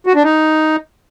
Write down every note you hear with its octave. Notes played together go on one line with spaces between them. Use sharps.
F#4
D4
D#4